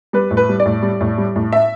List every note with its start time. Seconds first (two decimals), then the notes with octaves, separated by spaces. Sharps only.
0.13 G3 B4
0.31 A2
0.37 B4
0.49 G3
0.60 D5
0.65 A2
0.83 G3
1.01 A2
1.18 G3
1.36 A2
1.53 E5